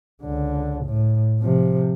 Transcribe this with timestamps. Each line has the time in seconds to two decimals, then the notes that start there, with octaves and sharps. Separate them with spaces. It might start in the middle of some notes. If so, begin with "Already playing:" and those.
0.23 C#2 D3
0.85 A2
1.41 C3 F3